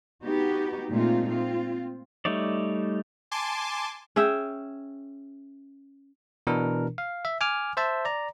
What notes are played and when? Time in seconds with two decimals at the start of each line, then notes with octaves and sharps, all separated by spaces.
0.23 B3 D#4 F#4 G4
0.89 A#2 G#3 A3 C4 D#4 F4
1.28 C4 F4
2.25 G3 A3 D#4 C#5 D5
3.31 G#5 A5 C6 D6
4.16 C#4 G#4 E5 G5
6.47 B2 E3 D4 A#4
6.98 F5
7.25 E5
7.41 G#5 D6 F6
7.77 C5 E5 A5
8.05 D5 A#5